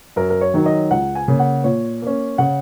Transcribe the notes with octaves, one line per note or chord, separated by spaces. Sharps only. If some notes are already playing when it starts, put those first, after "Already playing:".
F#2 A#4
A#4
C#5
D#3 F#3 D#4
D#5
C#2 F#5
G#5
C#3 A#3
F#5
A#2 C#5
A#3 C#4
C#3 F#5